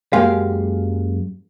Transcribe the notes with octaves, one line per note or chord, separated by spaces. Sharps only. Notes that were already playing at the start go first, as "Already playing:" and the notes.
F#2 G#3 A#3 G4 F5